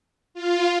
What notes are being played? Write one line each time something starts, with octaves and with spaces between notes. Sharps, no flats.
F4